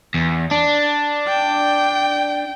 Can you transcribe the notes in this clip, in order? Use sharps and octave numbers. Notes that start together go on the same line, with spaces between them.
E2
D4
G5